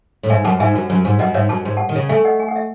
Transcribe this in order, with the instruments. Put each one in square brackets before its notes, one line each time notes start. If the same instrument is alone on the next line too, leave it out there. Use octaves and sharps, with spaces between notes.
[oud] A2
[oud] G#2 [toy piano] E5 G#5
[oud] F#2 [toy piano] F#5 A5
[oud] G#2 [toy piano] E5 G#5
[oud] F#2
F#2
G#2
[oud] F#2 [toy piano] D#5 F#5
[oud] G#2 [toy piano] C#5 E5
[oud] F#2 [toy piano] A5
[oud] G#2
[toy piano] F#5 A5
[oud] D#3
C#3
[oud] A3 [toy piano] E5 G#5
[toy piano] D#5 F#5
G#5
F#5
E5